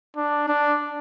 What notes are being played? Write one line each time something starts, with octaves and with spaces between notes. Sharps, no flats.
D4
D4